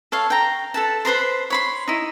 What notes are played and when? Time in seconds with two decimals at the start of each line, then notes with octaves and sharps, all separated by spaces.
0.12 A4 C#5 F5
0.30 G5 A#5
0.74 A4 B4 A5
1.05 B4 C5 A#5 C6
1.50 C#5 B5 C6
1.88 D#4 E4